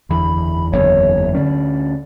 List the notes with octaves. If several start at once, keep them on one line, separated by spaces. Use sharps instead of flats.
F#1 E2 D3 B5
F#1 E2 D3 C#5
D2 D3 A3 C#4 D5